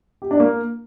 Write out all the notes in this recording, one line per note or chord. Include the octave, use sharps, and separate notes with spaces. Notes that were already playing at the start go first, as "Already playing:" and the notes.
G4
D4
A#3